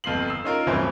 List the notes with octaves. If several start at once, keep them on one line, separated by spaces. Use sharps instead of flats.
G1 F2 F4 C7 F#7
E6 C7
C#4 D#4 F4 A#4
D1 G2 E3 C#4 E4 C5